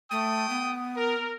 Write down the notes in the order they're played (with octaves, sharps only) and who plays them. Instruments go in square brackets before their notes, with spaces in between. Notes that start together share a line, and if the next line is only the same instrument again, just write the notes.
[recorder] A3 [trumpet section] G5 D#6
[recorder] B3
[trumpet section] A#4